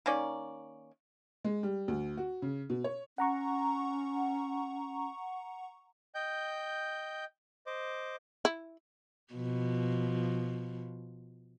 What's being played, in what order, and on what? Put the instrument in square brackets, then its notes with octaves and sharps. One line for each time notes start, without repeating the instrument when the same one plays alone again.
[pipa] D#3 A#3 C#4 D5
[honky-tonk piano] G#3
G3
D2
F#4
C#3
B2
C#5
[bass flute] C#4 [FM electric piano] F#5 A#5 C#6
[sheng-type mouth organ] D#5 G5 G6
C5 D#5 D6
[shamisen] E4
[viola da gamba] B2 F3